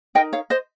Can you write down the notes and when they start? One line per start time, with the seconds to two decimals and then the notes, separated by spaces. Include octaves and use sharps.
0.15 D#4 A#4 D#5 G5
0.33 C#5 F5
0.50 C5 D#5